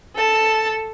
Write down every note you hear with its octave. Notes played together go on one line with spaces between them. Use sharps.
A4 A5